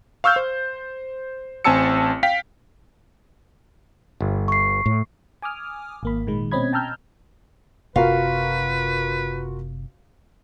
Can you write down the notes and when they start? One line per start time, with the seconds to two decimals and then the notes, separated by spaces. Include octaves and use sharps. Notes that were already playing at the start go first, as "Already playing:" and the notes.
0.24 F5 C#6 E6 F6 G6
0.36 C5
1.64 A1 C4 G#5 A5 E6 C#7
2.23 F5 G5 B6
4.21 G1
4.48 C#6 C7
4.86 A2
5.42 G#5 D6 D#6 F6
6.03 G#1 A#3 B5
6.27 A#2 D#3 G#3
6.51 B2 C4 C#4 D#5 B5 G#6
6.73 G5 A5 A#5 E6 F6 G6
7.96 F#1 C3 C4 F4 F#4 A#4 B4 F5